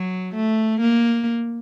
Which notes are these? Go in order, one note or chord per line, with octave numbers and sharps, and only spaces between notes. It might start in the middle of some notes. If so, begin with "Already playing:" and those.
Already playing: F#3
A3
A#3